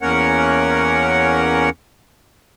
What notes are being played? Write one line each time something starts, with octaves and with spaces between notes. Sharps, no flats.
E2 A#3 C#4 A#4 C#5 F#5